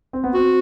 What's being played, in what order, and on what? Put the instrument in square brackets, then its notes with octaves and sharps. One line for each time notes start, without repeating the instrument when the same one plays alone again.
[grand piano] C4
B3
[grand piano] C4 [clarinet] F#4